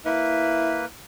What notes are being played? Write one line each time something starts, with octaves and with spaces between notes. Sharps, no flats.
A#3 E4 B4